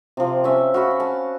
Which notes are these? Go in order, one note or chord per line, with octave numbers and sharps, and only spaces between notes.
C3 F3
C#4 E5
F#4 F5 B5
A5